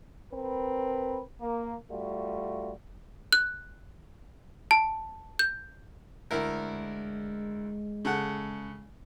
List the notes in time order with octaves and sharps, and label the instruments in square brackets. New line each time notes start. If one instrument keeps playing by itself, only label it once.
[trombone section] C4 A#4 B4
A#3
G3 A3 F4 F#4
[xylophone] F#6
A5
G6
[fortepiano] D2 E4 A#4 [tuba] G#3
[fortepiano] C#3 A4 F#5